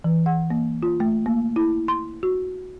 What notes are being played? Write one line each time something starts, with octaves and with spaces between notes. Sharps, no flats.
E3
F#5
A#3
F4
A3
A#3
E4
C6
F#4